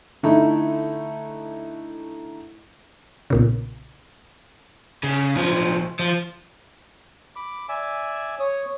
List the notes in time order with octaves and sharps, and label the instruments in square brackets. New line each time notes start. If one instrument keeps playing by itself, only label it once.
[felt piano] D3 A3 D#4 E4
[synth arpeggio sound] B1 A#2 C#3
[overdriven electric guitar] C#3
B1 F3
F3
[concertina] B5 D6
D5 E5 G#5
[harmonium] C#5 [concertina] D#6